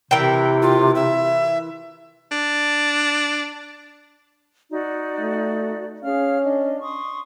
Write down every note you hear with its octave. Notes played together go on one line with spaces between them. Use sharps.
C3 E3 A#4 G5
F4
E5
D4
D#4 F#4 D5
A3
C#4 G#4 F5 F6
D4 D#5
C6 C#6 D#6